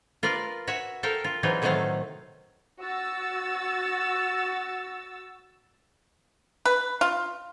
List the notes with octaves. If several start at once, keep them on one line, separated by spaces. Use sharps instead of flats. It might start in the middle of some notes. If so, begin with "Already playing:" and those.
F4 A#4 B4 D5 F5
F#4 C#5 E5
A4 A#4 F5 G5
F4
C3 E3 F#3 D#4 F4 G#4
A2 C3 D#3 F#3 A3 F5
F#4 E6 A6
B4
F4